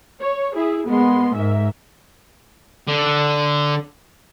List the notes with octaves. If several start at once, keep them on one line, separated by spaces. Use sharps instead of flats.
C#5
E4 G#4
G#3 A#3 B3 C6
G#2 A#4 E5
D3